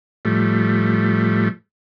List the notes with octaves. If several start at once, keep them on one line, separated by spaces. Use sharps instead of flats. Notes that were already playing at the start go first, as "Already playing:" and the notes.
A2 F3 G3 A3